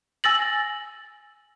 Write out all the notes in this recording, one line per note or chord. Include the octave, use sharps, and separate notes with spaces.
G#5 E6 A6 A#6 F#7